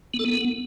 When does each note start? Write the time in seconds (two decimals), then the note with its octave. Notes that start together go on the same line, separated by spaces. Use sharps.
0.14 B3
0.19 A4
0.25 B3